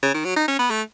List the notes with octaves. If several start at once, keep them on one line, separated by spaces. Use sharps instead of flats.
C#3
D#3
F#3
D#4
C#4
B3
A3